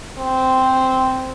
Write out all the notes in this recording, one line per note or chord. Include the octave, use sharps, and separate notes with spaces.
C4